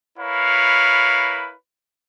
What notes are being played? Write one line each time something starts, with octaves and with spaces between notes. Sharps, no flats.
E4 A#4 B4 C#5 F5